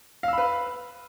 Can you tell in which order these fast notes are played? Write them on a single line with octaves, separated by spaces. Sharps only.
F5 E6 B5 B4